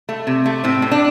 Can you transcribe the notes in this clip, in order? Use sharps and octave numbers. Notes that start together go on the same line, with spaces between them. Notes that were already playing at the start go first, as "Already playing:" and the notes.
A3
C3
A3
A2 C4
A2
D4